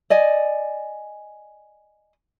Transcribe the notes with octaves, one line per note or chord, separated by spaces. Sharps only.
D5 D#5 G#5